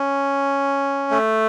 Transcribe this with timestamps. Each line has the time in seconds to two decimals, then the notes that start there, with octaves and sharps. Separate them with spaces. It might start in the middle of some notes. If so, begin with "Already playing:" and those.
Already playing: C#4
1.11 A3